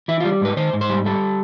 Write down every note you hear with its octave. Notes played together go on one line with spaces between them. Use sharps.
E3 E4
F4
G3
G#2 B4
D#3 C5
G#2
C5
G3
G3 A4